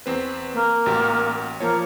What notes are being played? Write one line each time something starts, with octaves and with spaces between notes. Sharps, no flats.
E2 C4 B4
A#3
A1 F#4 G4
F3 A#3 C#5